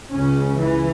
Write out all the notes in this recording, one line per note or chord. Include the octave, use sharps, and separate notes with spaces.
C#2 C#3 C#4
E3